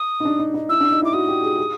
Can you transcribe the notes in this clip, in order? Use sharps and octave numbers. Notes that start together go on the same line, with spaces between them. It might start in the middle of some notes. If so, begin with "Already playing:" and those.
Already playing: D#6
D#4
D4
D#4
D#4
E4 E6
D4
D#4
E4
D6
F#4 D#6
G4
G#4
G#4